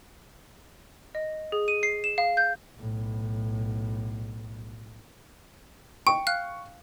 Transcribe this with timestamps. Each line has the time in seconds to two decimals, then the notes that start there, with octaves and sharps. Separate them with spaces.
1.15 D#5
1.52 G#4
1.68 D#7
1.83 C7
2.04 E7
2.18 F5
2.37 G6
2.78 B1 A2
6.07 G5 C#6
6.27 F5 F6 F#6